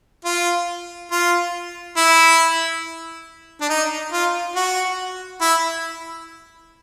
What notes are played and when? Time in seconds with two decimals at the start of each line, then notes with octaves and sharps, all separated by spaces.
0.25 F4
1.11 F4
1.97 E4
3.61 D4
3.69 D#4
4.12 F4
4.56 F#4
5.42 E4